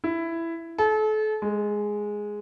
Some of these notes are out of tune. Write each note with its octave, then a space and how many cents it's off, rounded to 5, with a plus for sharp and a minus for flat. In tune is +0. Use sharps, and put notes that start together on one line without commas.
E4 +10
A4 -35
G#3 +0